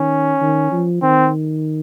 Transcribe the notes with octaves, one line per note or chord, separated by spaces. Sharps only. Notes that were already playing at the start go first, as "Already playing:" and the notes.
Already playing: D#3 C#4
D#3
F3
D#3 C4